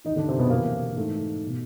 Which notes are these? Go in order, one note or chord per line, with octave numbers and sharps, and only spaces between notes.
D#3 D#4
D#2
D3 D4
C3 C4
B2 B3
F2 C3 E3 A#3
G#2 E3 A3
B2